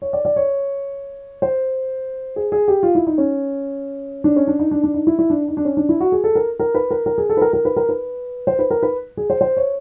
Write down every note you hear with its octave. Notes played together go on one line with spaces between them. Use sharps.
C#5
D5
D5
C#5
C5
G#4
G#4
G4
F4
E4
D#4
C#4
D4
C#4
D4
D#4
D4
D4
D#4
E4
E4
D4
D#4
D4
C#4
D4
E4
F#4
G#4
A4
A#4
A#4
B4
A#4
A#4
G#4
A4
B4
A#4
A#4
B4
A#4
B4
C5
B4
A#4
B4
G#4
C5
C5
C#5